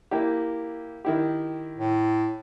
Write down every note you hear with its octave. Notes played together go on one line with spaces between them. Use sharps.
A#3 E4 G4
D#3 E4 G4
A2